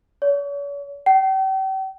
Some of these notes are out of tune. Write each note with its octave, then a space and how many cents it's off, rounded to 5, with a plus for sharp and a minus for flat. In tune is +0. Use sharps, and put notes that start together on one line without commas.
C#5 +45
G5 -40